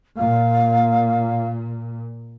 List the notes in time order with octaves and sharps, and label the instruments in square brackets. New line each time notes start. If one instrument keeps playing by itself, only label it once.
[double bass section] A#2 [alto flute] F5